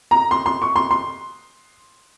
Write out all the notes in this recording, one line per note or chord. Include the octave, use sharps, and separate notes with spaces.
A#5
C6
C6
C#6
C6
C6